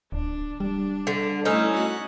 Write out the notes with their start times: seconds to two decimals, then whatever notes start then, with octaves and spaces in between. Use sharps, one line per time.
0.12 D1 D4
0.60 G3 D4
1.07 D3
1.45 A3 C#4 D#4 E4
1.74 F#4 F#5